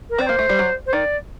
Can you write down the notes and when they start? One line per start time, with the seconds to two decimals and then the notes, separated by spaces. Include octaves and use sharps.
0.10 A#4
0.18 C4 D5
0.26 A#3 C5
0.39 A3
0.49 G3
0.59 F#3
0.86 C5
0.93 D#3 D5